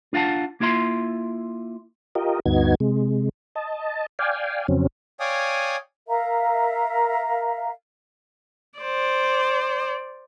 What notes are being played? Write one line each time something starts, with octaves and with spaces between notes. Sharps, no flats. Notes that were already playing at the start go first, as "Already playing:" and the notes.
D4 F4 F5 F#5 A5
A#3 E4 F4 E5 C6
F4 G4 A#4 D#5
D2 G2 B3 D#4 F#4 G#6
C3 G#3
D#5 A5
D5 F5 G5 G#5
F2 C#3 F#3 C4 C#4
C#5 D5 F5 G5 G#5 D#6
A#4 E5 F5 A#5
C5 D5